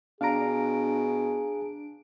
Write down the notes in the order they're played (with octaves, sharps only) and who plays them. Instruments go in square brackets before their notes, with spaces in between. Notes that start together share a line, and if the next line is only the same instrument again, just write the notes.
[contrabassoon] B2 [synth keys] D4 D7 [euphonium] G#4 [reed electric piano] F5 A#5